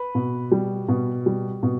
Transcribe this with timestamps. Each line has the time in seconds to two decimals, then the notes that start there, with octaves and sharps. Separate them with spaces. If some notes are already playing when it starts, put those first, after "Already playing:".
Already playing: B4
0.15 B2
0.51 G3
0.88 B2
1.26 G3
1.63 B2